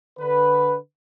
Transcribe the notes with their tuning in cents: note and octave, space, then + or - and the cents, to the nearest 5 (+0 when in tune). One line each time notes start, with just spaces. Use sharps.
D3 +0 B4 +0